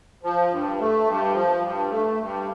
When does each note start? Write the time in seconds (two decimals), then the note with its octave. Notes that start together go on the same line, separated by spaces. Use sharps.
0.23 F3
0.51 G2
0.79 A3
1.07 G2
1.34 F3
1.62 G2
1.90 A3
2.18 G2